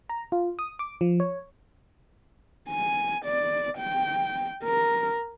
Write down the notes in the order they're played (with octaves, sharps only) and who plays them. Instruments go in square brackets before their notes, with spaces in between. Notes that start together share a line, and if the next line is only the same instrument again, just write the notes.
[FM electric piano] A#5
F4
D#6
D6
F3
C#5
[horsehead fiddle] G#5
D5
G5
A#4